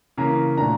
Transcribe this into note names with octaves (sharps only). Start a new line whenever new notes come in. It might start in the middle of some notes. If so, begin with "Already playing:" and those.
C#3 E3 A#3 A#5
A#2 A3 D4 A#5